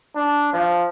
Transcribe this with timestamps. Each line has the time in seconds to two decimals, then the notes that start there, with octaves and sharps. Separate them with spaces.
0.15 D4
0.53 F3